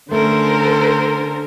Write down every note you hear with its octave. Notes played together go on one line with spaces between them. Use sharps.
D3 A3 C#4 A4 A#4 C5